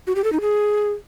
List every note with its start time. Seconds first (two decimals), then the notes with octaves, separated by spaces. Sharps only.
0.07 F#4
0.16 G4
0.24 A4
0.33 D#4
0.41 G#4